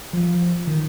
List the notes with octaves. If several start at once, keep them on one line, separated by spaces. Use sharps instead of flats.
F3
D#3